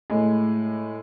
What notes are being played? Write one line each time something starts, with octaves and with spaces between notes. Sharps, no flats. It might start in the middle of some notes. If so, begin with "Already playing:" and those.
A2 G#3